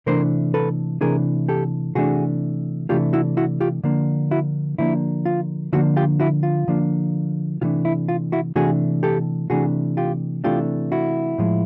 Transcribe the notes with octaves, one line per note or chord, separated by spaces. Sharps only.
C3 E3 A3 D4 A#4 C5
A4 B4
C3 E3 A3 D4 G#4 A#4
G4 A4
C3 E3 A3 D4 F#4 G#4
C3 E3 A3 D4 F4 G4
E4 F#4
E4 F#4
F4 G4
D3 F3 A#3 D4
E4 F#4
D3 F3 A#3 D4 E4
F4
D3 F3 A#3 D4 E4 F#4
F4 G4
E4 F#4
F4
D3 F3 A#3 D4
C3 E3 A3 D4 F4
E4
F4
E4 F#4
C3 E3 A3 D4 F#4 G#4
G4 A4
C3 E3 A3 D4 F#4 G#4
F4 G4
C3 E3 A3 D4 F4 G4
E4 F#4
A2 F3 G#3